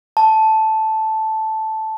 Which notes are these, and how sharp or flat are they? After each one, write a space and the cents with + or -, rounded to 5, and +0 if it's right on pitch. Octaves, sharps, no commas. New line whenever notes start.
A5 -5